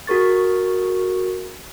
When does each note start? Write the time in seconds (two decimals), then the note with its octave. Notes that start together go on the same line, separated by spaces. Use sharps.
0.07 F#4 G#4 A#4 C#6 A6